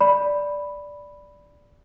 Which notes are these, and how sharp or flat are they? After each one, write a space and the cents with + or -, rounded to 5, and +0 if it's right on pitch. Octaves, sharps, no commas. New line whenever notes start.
D5 -5 B5 +0